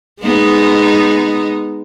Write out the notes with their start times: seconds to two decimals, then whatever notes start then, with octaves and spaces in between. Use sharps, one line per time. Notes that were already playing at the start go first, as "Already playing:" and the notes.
0.22 G#3 B3 D#4